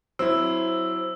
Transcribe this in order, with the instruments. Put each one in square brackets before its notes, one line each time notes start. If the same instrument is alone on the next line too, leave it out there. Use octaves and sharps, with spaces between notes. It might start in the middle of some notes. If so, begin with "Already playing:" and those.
[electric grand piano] F#3 E4 [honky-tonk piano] C4 [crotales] E6